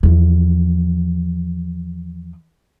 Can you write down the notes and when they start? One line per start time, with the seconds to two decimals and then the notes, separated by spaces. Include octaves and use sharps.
0.03 E2 F3